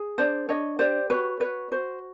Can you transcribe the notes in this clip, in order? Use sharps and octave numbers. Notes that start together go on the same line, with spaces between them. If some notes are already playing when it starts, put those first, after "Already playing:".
Already playing: G#4
D4 C5 D5
D4 C#5 D#5
G4 C5 D5
F#4 B4 C#5
F#4 B4 C#5
F#4 C5